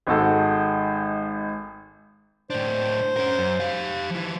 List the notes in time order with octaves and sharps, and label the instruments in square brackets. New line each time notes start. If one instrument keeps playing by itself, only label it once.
[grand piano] G#1 G#2 F#4 A4
[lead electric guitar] A2 D4 [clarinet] C5
[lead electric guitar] C#4 A#4
F#2
G4 F5
F3 E4